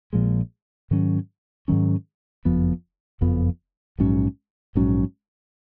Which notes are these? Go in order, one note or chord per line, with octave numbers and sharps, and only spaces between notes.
A#1 A#2 F3 G#3
G#2 D#3 F#3 C#4
G#2 D#3 F#3 C#4
F#1 F2 F3 B3
F#1 F2 F3 B3
A#1 G#2 F#3 C#4
A#1 G#2 F#3 C#4